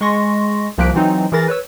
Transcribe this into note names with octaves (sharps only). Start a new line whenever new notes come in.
G#3 C6 C#6 A#6
C2 F3 A#3 F#6 B6 D7
E3 F#3 C4 D#4
E3 G#4 A#4 B5 A6 A#6
B4 C#5 E6